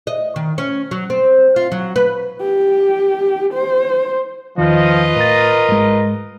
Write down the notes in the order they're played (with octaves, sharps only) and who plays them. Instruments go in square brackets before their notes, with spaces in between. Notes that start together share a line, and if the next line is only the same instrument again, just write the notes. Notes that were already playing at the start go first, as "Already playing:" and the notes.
[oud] D#5
D#3
C#4
F#3
C4
F4
F#3
B4
[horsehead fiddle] G4
C5
[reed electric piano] E2 D#3 [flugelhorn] F3 [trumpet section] F4 B4 D#5
[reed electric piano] A2 A6 [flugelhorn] A#4
[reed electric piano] G#2 G#3